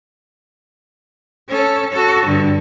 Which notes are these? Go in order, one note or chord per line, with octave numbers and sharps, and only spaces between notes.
C#4 A4
F#4 A4
G2 D3